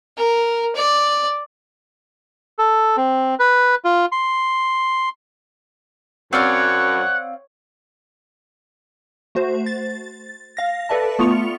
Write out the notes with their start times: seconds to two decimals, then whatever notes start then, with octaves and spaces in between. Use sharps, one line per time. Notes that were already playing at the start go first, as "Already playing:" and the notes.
0.17 A#4
0.76 D5
2.59 A4
2.97 C4
3.39 B4
3.84 F4
4.12 C6
6.33 F#2 C4 C#5 D5 F5 F#5
9.35 A3 F#4 C5
9.66 A6
10.57 F5 A#6
10.89 A4 B4 D5 E5 A5
11.19 A3 B3 F4 C#6 C#7 F7